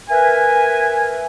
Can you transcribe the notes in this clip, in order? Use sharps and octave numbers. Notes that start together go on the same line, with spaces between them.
A#4 B4 E5 G#5